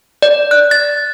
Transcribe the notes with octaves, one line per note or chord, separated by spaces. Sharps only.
D5
F#6
A6